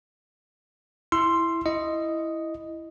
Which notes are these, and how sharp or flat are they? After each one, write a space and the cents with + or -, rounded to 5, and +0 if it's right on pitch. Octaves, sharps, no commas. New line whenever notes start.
E4 +0 C6 +0 E6 +30
E4 +0 D#5 +0